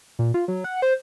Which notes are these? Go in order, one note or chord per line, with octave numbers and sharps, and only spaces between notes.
A#2
F4
F#3
F#5
C5